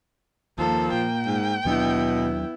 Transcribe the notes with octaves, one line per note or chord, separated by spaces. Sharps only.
D#2 F3 A#3 A4
A#2 G5
G#2
D#2 B2 F#3 B3 D4 E4